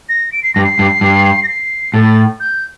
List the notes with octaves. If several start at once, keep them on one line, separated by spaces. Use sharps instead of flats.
A#6
D7
C7
G2 A#6
C7
G2
G2
A#6
C7
A2 A6
G6